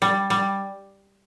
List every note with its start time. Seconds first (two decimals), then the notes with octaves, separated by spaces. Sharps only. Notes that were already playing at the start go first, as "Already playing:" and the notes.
0.02 G3
0.30 G3